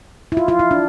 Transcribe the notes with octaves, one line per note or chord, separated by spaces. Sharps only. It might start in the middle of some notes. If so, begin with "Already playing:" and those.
E4
F4
F4
E4
D4